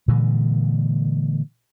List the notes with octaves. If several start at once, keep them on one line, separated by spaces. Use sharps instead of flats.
A#2 D3 E3 G#3